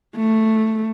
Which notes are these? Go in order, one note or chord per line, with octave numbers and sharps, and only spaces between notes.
A3